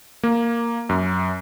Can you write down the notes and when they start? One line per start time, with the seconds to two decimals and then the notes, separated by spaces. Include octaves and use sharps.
0.23 A#3
0.89 F#2